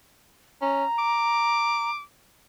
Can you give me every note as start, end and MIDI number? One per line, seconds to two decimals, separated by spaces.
0.62 0.84 61
0.62 1.91 82
0.98 2.01 86